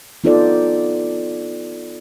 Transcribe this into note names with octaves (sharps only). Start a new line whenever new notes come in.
B3 D#4 F4 A4 C5 D5